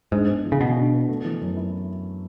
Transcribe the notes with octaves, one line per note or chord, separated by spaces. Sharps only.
G#2 D4
B3
E3
C#3
B2 E3
D4
B3
A3
E3
F#2
E4